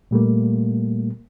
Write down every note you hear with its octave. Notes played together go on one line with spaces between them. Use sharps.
A#2 G3 A3 A#3